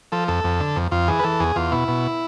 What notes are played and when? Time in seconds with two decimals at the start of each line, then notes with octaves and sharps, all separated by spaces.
0.12 F3 A4
0.28 F2 A4
0.44 F2
0.60 D3
0.76 F2
0.91 F2 F4
1.08 E3 G#4
1.19 B4
1.24 E3 A4
1.40 E2 G#4
1.56 E2 F4
1.72 B2 E4
1.88 B2